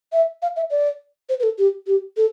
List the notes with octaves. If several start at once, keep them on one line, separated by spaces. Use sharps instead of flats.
E5
F5
E5
D5
C5
B4
A4
G4
G4
A4